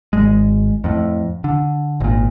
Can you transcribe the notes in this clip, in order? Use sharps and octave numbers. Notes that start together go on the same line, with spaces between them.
G#1 G#3
F2 A2
D3
G#1 A#2